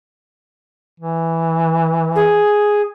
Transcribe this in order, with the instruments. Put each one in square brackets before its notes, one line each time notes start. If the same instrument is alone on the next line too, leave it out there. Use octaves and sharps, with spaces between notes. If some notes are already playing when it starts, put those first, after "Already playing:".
[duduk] E3
[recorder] G#4